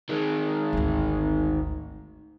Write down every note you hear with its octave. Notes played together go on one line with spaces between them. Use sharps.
D#3 G#3
G#1 D2